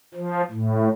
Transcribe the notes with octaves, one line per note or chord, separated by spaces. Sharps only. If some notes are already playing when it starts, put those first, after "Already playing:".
F3
A2